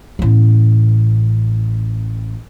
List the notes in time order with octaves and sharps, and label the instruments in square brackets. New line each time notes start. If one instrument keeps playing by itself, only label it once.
[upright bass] A1 B3